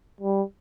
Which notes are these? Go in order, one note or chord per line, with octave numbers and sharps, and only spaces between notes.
G3